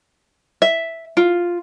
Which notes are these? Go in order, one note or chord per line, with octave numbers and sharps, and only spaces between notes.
E5
F4